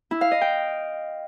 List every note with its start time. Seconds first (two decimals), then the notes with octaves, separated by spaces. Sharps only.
0.11 E4
0.21 F5
0.31 D#5
0.41 G5